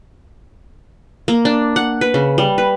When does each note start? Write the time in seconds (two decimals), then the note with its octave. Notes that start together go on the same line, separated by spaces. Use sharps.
1.28 A#3
1.45 D4
1.76 F#5
2.01 B4
2.14 C#3
2.38 G3
2.58 B4